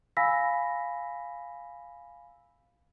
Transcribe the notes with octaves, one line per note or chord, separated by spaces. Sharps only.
F5 G#5 B5 E6 A#6 B6